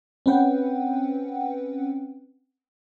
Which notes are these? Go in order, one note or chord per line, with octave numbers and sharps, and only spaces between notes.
C4 C#4 B4 F#5 G5